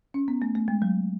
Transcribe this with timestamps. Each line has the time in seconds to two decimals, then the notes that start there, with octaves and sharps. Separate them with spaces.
0.14 C#4
0.28 B3
0.42 A3
0.55 A3
0.68 G#3
0.82 F#3